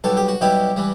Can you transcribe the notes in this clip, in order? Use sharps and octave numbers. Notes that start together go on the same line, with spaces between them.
B1 B2 G3 A4
G4
F#4
B1 B2 G3 E4 G4
E3 G3